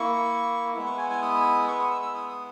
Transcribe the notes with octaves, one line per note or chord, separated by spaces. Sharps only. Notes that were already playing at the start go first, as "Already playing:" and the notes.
Already playing: A#3 E4 C#6
G#3 B3 E4
C#6
G#5
G#5
D#6
C#6
D#6
E6
E6
D#6
D#6